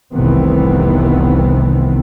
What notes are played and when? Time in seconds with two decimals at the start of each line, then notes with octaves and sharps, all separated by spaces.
0.14 F1 C2 D#3 E3 B3 C4